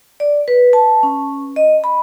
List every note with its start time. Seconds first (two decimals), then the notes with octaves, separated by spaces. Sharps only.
0.20 D5
0.48 B4
0.73 A5
1.03 C#4
1.56 D#5
1.84 B5